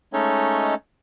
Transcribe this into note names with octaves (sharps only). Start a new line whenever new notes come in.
G#3 A3 C#4 D#4 A4 C#5